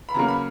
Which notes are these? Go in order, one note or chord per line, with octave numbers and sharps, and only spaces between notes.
B5
C#3 F#3 A#3 A#5
B5